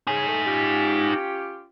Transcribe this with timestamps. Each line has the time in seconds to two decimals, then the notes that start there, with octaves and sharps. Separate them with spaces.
0.07 C#3 D#4 G#5
0.27 A3
0.45 C#4 F4 G4